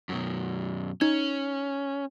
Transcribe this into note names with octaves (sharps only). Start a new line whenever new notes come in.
F#2 B2
C#4 D#4 G#6